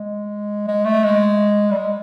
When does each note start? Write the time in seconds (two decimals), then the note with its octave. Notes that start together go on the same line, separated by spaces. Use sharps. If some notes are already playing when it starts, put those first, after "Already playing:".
Already playing: G#3
0.68 G#3
0.85 A3
1.04 G#3
1.71 G3
1.77 G#3